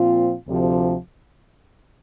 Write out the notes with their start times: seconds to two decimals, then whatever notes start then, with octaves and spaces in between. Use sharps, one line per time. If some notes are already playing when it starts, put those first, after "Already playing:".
Already playing: A#2 F3 C4 F4
0.46 D2 C3 F3